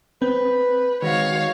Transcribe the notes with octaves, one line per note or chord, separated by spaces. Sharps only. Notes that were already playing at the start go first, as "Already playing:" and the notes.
C4 B4
D#3 G#3 F#4 C#5 F5